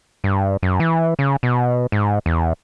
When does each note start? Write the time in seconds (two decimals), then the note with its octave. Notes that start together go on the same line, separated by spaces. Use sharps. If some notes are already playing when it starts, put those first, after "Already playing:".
0.24 G2
0.63 F#2
0.80 E3
1.19 C#3
1.43 B2
1.92 G#2
2.26 E2